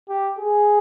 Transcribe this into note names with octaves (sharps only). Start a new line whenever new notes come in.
G4
G#4